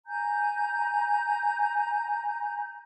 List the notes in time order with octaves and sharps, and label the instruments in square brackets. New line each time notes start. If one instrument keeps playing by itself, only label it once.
[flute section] G#5 A#5 G6